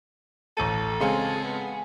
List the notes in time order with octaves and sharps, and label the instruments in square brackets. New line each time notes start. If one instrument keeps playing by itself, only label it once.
[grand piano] A1 A3 D#7 [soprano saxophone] A4
[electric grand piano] C#3 G#3 C4 [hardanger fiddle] G#4 [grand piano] F5 C6 C#7
[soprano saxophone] B3